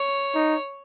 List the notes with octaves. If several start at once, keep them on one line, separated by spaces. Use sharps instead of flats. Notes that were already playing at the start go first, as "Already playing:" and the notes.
Already playing: C#5
D#4